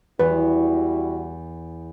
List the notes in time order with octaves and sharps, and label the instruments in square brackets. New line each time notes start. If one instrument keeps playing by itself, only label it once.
[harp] E2 [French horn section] G3 E4 F#4 [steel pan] B4